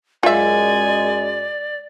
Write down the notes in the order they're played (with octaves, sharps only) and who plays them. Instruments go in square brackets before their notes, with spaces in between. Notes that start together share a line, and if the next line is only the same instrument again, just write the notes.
[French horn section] F#2 G#3 [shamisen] F4 E5 [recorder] D5 [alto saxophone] G#5